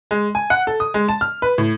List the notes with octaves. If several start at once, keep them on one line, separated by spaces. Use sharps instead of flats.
G#3
G#5
F#5
A4
D#6
G#3
A5
F6
B4
A2